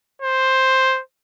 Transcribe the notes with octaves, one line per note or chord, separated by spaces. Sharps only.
C5